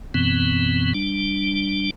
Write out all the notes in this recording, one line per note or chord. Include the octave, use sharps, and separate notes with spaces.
F#2 B2 E3 B3 C4
G3 D4